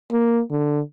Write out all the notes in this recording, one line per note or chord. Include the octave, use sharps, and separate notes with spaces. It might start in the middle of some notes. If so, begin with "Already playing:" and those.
A#3
D3